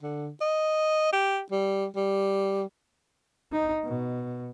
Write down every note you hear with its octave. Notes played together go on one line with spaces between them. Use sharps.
D3
D#5
G4
G3
G3
D#4
B2